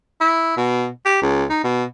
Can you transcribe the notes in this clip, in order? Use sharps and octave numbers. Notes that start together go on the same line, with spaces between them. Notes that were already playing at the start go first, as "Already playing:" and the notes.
E4
B2
G4
C#2
D#4
B2